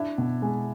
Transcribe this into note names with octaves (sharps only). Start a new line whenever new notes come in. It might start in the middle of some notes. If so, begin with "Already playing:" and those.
Already playing: D4 E4
B2
G#3